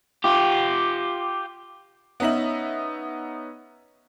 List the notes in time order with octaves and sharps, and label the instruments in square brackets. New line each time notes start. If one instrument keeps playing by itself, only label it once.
[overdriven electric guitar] F4 G4
[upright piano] B3 C#4 D#4 E5 F#7